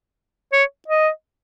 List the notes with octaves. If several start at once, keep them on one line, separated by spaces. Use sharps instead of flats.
C#5
D#5